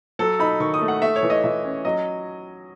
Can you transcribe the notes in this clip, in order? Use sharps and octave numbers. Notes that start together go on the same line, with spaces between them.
F#3 A4
D#4 B5
D#3 C#6
D#6
A3
F#5
A3 E5
C#5
E3
D#5
E3 E5
C#4
F#3 D#5